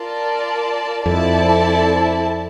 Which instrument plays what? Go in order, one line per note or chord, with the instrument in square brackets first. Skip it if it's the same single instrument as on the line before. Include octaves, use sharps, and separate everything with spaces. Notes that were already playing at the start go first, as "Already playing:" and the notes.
Already playing: [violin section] F4 A#4 D5 A5
[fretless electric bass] F2 [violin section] C4 E4 A4 D5 A5